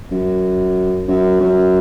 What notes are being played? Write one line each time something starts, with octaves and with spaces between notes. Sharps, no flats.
F#2
F#2
F#2